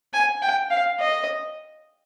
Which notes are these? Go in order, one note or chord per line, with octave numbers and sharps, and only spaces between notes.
G#5
G5
F5
D#5